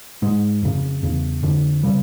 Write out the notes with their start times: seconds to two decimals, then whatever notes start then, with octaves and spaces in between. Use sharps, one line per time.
0.22 G#2 G#3
0.62 F2 C#3
1.03 E2 C#3
1.43 F2 D3
1.83 C#3 G3